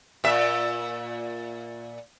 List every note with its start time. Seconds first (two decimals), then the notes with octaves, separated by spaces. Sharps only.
0.24 A#2 E5